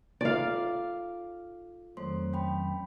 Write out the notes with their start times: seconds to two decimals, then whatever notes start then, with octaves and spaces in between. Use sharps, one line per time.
0.21 D#4 F4 A4 D5 F5
1.97 F2 D#3 F#3 A3 C5 C6
2.33 C#4 G5 B5